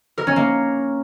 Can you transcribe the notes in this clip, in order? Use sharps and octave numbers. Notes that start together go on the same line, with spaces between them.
A#4
C#4
A#3